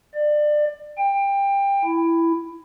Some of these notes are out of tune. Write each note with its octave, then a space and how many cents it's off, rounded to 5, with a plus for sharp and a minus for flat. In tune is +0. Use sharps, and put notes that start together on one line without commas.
D5 +25
G5 +20
E4 +10